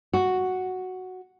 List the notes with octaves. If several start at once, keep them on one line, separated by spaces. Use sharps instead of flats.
F#4